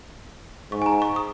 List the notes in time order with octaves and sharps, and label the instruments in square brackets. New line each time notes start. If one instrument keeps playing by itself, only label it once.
[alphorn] G#2 [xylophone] C#6
[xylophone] G#5
A#5
C#6
D#6